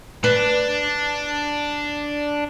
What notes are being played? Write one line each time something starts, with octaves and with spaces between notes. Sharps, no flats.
D4 B4